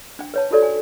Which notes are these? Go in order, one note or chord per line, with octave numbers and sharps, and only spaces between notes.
D4 G5
B4 C#5 A5
D#4 F#4 G4 A4 C#5 D5
G#5